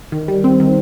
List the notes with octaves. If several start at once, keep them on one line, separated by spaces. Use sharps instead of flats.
D#3
G3
C4
D#3